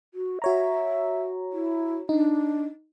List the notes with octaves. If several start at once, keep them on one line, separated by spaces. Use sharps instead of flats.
F#4
F#4 C#5 E5 A#5
E4
D4 D#4